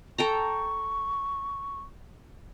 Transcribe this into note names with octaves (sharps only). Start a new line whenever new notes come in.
A4 G5 A#5 C#6